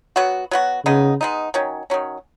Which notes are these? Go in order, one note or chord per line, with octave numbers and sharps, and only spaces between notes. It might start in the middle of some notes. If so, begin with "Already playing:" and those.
F#3 B3 F#4
F#3 B3 F#4
C#3 G#3 B3 D#4
G#3 B3 D#4
D#3 F#3 C#4
D#3 F#3 C#4